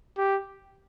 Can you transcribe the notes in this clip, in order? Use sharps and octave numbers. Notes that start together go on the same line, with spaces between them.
G4